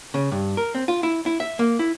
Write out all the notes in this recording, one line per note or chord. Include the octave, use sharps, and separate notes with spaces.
C#3
G2
A#4
C4
F4
E4
E4
E5
A#3
E4